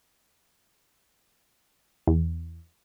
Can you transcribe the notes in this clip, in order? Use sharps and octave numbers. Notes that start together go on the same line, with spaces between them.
E2